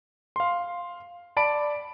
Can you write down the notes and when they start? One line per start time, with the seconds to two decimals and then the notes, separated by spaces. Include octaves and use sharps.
0.36 F5 C6
1.37 D5 A5 B5 D7